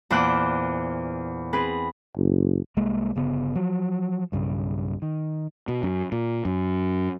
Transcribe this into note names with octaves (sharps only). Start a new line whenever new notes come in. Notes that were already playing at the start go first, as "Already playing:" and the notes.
E2 A#2 C5 D5 E6 F#6
C4 G#4 B4
F#1
C2 G#3 A#3
G1 C#3 B3
F3 F#3
B1 G2 C#3
D#3
B2
F#2
A#2
F#2